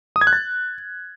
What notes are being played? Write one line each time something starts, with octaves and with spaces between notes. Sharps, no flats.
D#6
G#6
F#6
A6